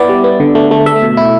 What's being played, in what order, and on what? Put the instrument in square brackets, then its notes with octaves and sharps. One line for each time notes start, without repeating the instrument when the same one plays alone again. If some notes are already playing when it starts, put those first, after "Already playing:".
Already playing: [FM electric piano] B3 E4 D5
G3
B3
D3
A3
A3
A3 E5
B2
E4